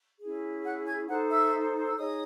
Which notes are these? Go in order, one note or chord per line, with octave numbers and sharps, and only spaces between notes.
C#4 E4 G#4
F#5 F#6
G#5 G#6
D#4 A4 C5 F#5 F#6
E5 E6
E6
D#4 G#4 C#5 D#5 D#6